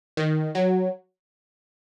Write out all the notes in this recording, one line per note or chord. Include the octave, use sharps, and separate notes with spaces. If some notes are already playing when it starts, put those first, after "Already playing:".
D#3
F#3